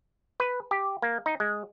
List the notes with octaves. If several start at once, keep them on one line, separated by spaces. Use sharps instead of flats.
B4
G4
A#3
D#4
G#3